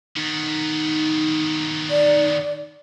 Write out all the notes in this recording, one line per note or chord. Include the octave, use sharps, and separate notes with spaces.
D#3 B3 D#4
D5